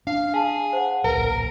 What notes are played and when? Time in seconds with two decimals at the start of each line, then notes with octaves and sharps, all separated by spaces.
0.07 D4 F5
0.34 G#4 F5 A5
0.73 C5 F#5
1.04 D1 A#1 A#4 B4